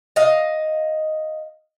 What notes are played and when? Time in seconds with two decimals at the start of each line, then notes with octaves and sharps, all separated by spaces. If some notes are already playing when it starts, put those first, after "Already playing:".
0.16 D#5 F5